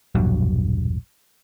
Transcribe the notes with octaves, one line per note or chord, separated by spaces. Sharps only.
E1 A#1 G2 F#3